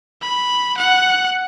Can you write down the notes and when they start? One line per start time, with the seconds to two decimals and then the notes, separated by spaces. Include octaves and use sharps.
0.22 B5
0.77 F#5